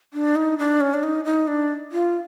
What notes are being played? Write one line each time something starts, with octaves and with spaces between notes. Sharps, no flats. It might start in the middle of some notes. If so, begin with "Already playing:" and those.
D4
D#4
D4
C#4
D4
D#4
D#4
D4
F4